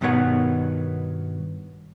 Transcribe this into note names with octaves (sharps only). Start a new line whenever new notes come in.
G2 B2 D#3 B3 C#5 F#5